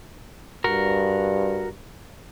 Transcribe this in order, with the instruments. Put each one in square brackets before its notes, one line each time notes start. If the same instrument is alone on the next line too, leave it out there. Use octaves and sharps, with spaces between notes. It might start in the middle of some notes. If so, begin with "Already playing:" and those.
[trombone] G2 [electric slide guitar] F#4 A#4